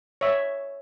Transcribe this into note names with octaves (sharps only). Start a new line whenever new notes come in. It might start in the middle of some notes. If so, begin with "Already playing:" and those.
C#5 E5